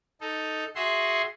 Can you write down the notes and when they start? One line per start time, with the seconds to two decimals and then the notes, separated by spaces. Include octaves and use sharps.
0.21 D#4 A4
0.75 F#4 G#4 E5 F#5 C6